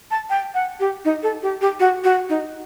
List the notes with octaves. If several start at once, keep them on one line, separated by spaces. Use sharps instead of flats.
A5
G5
F#5
G4
D#4
A4
G4
G4
F#4
F#4
D#4